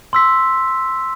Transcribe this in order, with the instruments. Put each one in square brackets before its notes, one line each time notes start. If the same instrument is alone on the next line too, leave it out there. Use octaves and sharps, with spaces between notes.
[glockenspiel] C6 E6 B6